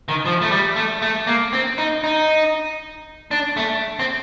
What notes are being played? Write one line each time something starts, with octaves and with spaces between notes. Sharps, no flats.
D#3
F3
A3
G3
A3
A3
A#3
C4
D#4
D#4
D4
A3
C4